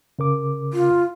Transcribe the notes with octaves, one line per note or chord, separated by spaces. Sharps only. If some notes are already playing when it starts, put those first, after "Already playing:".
C#3 A#4 D6
F4